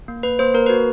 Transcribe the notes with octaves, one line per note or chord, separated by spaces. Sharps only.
A#3
A#3 B4
A#3 C5
A#3 A#4
B4
F#4